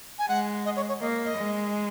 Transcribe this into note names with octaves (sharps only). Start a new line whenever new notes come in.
G#5
G#3 F#5
D#5
C#5
C#5
A#3 D#5
D#5
G#3